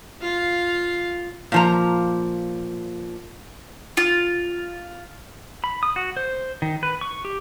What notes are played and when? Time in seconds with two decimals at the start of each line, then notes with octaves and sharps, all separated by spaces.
0.22 F4 F5
1.52 A#2 F3 A#5
3.97 F4
5.64 B5
5.83 D#6
5.96 F#4
6.17 C5
6.62 D#3
6.83 B4
7.01 C#6
7.25 G4